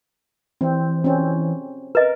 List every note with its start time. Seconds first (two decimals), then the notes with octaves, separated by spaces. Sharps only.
0.61 E3 C4
1.04 C4 C#4
1.95 A#4 B4 D#5